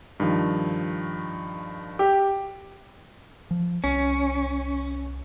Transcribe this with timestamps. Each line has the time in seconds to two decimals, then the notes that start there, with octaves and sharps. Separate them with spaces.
0.20 G2 D#3 F3
1.99 G4
3.51 F3
3.84 C2 C#4